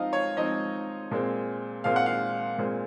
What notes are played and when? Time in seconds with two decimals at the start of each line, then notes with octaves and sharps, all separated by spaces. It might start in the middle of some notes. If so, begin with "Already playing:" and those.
Already playing: F3 C4 D#4 D#5 F5
0.13 C#5
0.37 F3 C4 D#4 D#5
1.11 A#2 G#3 C4
1.84 A#2 G#3 C4 F5
1.96 F#5
2.06 F5
2.58 A#2 G#3 C4